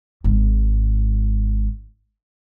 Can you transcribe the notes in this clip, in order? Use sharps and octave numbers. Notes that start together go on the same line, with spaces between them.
G#1 G#2